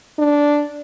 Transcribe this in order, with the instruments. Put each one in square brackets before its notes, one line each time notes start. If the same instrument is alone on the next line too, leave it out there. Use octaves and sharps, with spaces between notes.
[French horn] D4